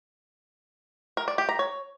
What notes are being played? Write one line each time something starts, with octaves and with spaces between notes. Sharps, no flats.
A#4
D5
G4
A#5
C#5